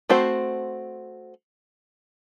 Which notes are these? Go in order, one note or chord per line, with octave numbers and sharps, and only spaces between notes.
A3 C4 F#4 C5